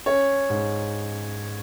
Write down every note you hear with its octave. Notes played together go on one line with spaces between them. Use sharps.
C#4 C#5
G#2